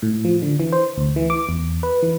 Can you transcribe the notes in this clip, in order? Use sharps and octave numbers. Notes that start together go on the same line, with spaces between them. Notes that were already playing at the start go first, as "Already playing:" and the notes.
A2
F3
D3
E3
C5
D2
E3
D6
E2
B4
E3